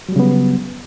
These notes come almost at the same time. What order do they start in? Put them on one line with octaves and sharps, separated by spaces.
F#3 G3 C#3 B3